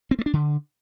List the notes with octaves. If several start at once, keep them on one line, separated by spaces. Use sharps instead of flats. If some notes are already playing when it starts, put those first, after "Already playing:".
C4
A3
D4
D3